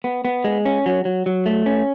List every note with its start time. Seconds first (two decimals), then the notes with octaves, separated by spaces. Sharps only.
0.04 B3
0.25 B3
0.44 G#3
0.65 C#4
0.86 F#3
1.05 F#3
1.26 F#3
1.46 A3
1.66 C#4